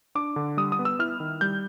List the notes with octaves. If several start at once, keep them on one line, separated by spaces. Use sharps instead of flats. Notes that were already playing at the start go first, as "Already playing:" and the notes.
D4 D6
D3
G3 D#6
D#6
B3
E6
E4 F6
D#3
G3 G6